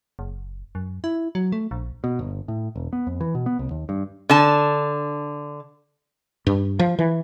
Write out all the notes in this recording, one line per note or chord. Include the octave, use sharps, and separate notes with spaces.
F#1
F#2
E4
F#3
A3
A#1
B2
G1
A2
E1
B3
F2
E3
B2
B3
C2
D#2
G2
D3 A5
G2
F3
E3